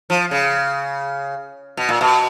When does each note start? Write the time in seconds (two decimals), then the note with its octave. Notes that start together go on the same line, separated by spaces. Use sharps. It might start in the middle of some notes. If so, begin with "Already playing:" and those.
0.10 F3
0.31 C#3
1.77 B2
1.89 A#2
2.01 B2